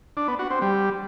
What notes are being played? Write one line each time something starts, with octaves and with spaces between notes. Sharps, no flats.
D4
B3
F#4
C4
G3